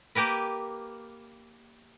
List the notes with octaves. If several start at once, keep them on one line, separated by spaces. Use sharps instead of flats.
A#3 G4 A#4 B4